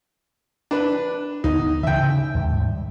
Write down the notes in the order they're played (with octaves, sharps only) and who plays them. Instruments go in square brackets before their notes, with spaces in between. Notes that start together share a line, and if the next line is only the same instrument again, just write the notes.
[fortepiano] D4 B4
[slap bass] D2 B3 [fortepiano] D#4
[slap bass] C#3 E3 [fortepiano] E5 G5
[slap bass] D#2 G#2 D#3
G3